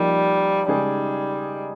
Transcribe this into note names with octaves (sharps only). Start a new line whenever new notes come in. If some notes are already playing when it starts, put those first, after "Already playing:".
Already playing: F3 G3 A#3 D#4
C#3 G3 G#3 D#4 G#4